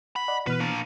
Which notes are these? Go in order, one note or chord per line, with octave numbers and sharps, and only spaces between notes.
F#5 B5
D5 D#5 F#5
B2 E3 B4 F6
A#3 D4